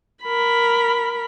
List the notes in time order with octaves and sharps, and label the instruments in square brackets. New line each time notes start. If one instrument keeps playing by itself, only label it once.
[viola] A#4 B5